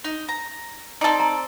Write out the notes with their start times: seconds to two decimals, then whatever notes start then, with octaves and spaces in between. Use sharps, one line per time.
0.04 D#4
0.29 A#5
1.01 C4 D#4 A4 D5
1.20 A#5